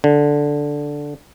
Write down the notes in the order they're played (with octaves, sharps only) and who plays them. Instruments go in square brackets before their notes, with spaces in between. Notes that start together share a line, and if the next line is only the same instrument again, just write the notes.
[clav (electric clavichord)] D3